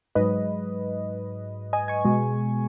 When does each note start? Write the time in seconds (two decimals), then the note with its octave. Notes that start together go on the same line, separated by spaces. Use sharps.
0.15 G#2 F#3 B4 D#5
1.73 D#5 G#5
1.88 G#5 C#6
2.05 B2 G#3